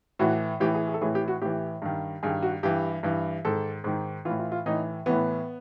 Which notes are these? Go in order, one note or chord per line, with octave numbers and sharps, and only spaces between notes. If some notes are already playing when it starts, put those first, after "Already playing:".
A2 E3 F#4
A2 E3 G4
G#4
G#4
A4
A2 E3 G#4
G4
F#4
A2 E3 G4
G2 D#3
G2 D#3 G#4
F#4
G2 E3 G4
G2 E3
G#2 D#3 A4
G#2 D#3
A2 E3 F4
F4
F4
A2 E3 D#4
A2 E3 B3